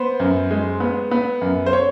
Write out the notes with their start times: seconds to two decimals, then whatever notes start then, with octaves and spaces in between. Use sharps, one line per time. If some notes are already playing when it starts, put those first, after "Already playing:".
Already playing: B3 C5
0.20 F#2
0.51 G#3
0.80 B3
1.11 B3
1.41 F#2
1.66 C5
1.73 C#5